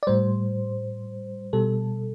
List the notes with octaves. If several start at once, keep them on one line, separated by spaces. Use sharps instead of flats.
D5
A2 G3 C5
B2 G3 A4